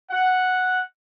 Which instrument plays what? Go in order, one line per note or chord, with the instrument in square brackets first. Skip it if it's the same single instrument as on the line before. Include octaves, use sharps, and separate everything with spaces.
[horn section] F#5